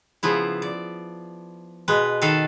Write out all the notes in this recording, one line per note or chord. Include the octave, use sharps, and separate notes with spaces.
C#3 F3 B3 E4
D5
B2 G#3 B4
D#3 A4 B4 F5